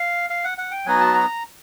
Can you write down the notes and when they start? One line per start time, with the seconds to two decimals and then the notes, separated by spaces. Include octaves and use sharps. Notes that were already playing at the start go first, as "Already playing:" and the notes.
Already playing: F5
0.30 F5
0.44 F#5
0.58 F#5
0.71 G5
0.86 F#3 B3 D#4 F#4 G#5
1.01 A5
1.14 A#5